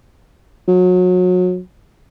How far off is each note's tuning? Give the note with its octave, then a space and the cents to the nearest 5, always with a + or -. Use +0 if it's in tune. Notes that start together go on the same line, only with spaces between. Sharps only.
F#3 -30